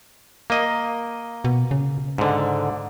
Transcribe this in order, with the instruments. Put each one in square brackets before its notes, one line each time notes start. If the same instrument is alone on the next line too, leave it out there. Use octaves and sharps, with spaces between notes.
[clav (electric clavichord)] A#3 D#5
[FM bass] B2
C#3
[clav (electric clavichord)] G#2 D3